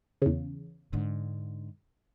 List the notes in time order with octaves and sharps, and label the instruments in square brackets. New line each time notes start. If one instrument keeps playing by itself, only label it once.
[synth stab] E2 C#3
[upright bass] G#2 D3